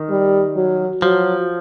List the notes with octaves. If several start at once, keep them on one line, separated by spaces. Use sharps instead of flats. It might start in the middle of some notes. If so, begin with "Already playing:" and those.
Already playing: D#3
G3
F#3
F3 F#3